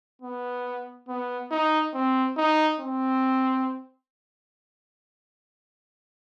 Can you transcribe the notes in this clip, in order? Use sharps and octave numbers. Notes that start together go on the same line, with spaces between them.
B3
B3
D#4
C4
D#4
C4